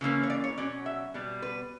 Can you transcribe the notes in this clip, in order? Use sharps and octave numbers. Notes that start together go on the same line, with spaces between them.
C#3 E3 A#3 C#4
C#5
D5
C#5
B2 F#3 C#4 D5
E5
B2 G3 B3
B4